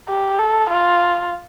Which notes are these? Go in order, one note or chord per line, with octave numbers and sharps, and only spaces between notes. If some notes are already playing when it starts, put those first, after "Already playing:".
G4
A4
F4